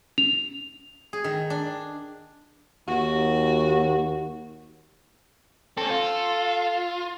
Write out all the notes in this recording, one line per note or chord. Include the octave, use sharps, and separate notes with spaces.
F7
G#4
D#3
D4
D#2 F#4
C4 C#4 A4
F4